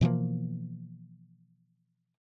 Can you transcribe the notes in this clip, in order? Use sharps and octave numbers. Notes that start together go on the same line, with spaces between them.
B2 E3 F3 A#3